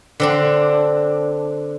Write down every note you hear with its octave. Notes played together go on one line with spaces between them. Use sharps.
D3 C4 D4